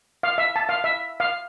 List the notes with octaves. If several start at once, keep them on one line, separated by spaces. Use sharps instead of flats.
F5
E5
A5
F5
E5
F5